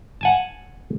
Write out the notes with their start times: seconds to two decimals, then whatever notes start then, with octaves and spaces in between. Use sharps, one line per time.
0.21 F#5 G#5 A5